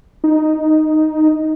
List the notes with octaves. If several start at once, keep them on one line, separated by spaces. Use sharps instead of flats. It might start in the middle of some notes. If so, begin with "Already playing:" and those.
D#4